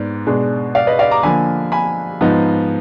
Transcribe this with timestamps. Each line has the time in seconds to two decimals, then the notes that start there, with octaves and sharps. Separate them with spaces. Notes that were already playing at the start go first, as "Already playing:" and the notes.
Already playing: G#2 B3 D5
0.27 B2 G#3 D4
0.75 D5 F5
0.87 B4 D#5
0.99 D5 F5
1.11 A#5 D6
1.23 D3 F3 A#3 G#5 B5
1.72 G#5 B5
2.21 G#2 F3 B3 D#4